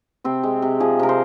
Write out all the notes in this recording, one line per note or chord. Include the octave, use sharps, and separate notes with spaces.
C3 C4
G#3
C3
F3 G#4
C3 A#4
C5